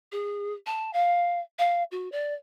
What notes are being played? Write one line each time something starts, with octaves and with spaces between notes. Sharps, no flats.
G#4
A5
F5
F5
F#4
D5